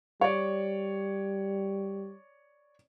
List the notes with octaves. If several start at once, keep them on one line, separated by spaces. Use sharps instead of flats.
G3 C#5 D5